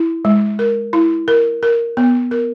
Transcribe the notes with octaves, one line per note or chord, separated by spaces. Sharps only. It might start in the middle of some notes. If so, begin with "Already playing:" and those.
Already playing: E4
G#3
A#4
E4
A#4
A#4
B3
A#4